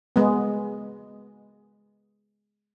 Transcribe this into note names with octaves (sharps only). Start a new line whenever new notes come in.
G#3 B3